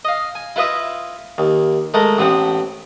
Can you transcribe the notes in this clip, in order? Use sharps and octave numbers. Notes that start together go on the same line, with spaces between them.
D#5 F5
G#5
E4 F4 B4 D#5 E5
D#2
G#3 A3 A4 A#4 F#5
A1 B3 C4 F#5